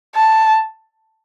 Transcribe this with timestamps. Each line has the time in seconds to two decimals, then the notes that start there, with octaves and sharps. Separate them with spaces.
0.15 A5